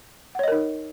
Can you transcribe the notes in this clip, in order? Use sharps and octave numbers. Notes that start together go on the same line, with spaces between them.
D#4 A#4 C#5 D#5 F#5